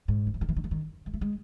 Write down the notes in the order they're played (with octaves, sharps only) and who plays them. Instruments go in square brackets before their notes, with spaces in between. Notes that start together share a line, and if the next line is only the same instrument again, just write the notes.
[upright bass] G#2
D#3
E3
D#3
E3
D#3
E3
D#3
G#3
A3
G#3